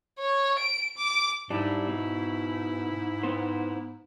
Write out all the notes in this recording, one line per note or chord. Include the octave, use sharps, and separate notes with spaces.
C#5
D7
D6
G#2 G3 D4 E4
B2
B3 C5